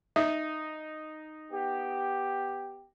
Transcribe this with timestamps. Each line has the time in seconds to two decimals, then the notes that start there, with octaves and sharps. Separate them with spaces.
0.16 D#4 E5
1.52 B3 G4